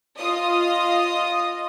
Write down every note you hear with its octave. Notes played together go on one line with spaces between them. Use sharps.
F4 D#5 D#6